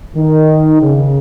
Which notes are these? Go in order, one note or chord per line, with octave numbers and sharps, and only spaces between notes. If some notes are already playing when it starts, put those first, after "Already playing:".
D#3
C#3